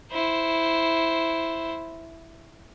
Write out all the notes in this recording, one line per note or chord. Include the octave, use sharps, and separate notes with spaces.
E4 C5